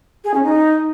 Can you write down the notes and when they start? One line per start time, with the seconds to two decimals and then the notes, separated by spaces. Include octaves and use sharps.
0.24 G#4
0.34 C#4
0.44 D#4